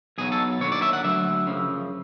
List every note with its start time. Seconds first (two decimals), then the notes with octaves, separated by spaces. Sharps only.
0.18 B1 B2 F#3 G#4
0.32 A4
0.61 D#2 D3 F#3 C#5
0.72 D5
0.82 E5
0.93 F#5
1.04 D2 D3 F#3 E5
1.46 F#2 C#3 F3